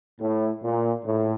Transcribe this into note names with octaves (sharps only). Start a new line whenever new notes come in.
A2
A#2
A2